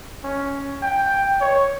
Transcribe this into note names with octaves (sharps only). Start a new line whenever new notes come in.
C#4
G5
C#5